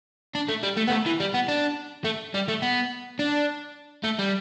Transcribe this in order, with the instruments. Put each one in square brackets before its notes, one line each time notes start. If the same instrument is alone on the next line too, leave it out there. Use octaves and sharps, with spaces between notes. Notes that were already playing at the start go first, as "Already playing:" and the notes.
[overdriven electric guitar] D4
A3
G3
A3
B3
A3
E3
G3
B3
D4
A3
G3
A3
B3
D4
A3
G3